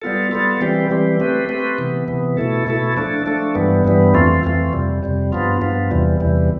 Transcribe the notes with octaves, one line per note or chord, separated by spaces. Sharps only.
G3 B3 F4 A4
G3 B3 F4 A4
E3 G3 C4 G4
E3 G3 C4 G4
A3 C4 G4 B4
A3 C4 G4 B4
C3 E3 B3
C3 E3 B3
B2 A3 E4 A4
B2 A3 E4 A4
F3 A3 D4 A4
F3 A3 D4 A4
G2 E3 G3 B3
G2 E3 G3 B3
F2 E3 A3 C4 F4
F2 E3 A3 C4 F4
F2 C3 G3
F2 C3 G3
G2 F3 B3 F4
G2 F3 B3 F4
E2 C3 E3 G3
E2 C3 E3 G3